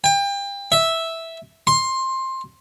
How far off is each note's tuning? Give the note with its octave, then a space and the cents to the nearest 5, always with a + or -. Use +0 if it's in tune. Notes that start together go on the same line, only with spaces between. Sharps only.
G5 +30
E5 -5
C6 +15